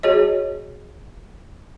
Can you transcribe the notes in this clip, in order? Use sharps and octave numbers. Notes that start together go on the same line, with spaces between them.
F#4 G#4 C#5 D#5